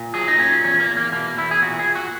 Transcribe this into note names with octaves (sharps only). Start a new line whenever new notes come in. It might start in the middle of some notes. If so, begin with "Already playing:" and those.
Already playing: A#2
F#3 G#4
D#4
A#2 C#4
E2 C#4
A#3
E2
A#3
B2 A#3
E2 E4
G#4
A#2 F#4
G#4
A#2
F#4